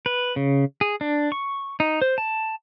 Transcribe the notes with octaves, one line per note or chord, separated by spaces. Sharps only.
B4
C#3
G#4
D4
C#6
D#4
C5
A5